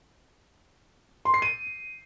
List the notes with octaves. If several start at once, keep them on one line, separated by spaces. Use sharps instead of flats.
C6
C7
D#7